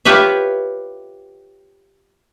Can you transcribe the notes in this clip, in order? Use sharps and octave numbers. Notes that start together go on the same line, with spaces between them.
F4 G4 B4 C#5 E5